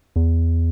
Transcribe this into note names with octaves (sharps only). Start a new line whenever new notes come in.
E2